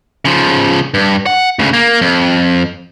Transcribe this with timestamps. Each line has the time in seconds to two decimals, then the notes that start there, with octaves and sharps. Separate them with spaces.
0.25 C#3 F3
0.94 G2
1.26 F#5
1.59 D2 C#3
1.74 A#3
2.01 F2